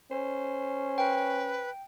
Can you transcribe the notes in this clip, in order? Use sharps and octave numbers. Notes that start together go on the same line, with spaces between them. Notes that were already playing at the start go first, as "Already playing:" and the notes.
C#4 C5
B4 G5